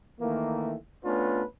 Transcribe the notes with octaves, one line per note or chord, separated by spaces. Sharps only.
D#3 E3 A3 A#3
A3 B3 C#4 D4 F4 B4